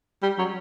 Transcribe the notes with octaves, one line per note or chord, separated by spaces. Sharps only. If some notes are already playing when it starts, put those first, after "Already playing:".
G3
F#3